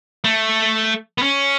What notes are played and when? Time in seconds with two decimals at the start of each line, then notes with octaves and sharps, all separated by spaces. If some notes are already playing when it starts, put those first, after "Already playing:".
0.24 A3
1.18 B3
1.22 C#4